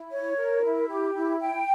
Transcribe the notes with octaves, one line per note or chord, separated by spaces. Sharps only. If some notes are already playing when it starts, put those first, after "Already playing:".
Already playing: E4
C#5
A#4
E4
G4
E4
G5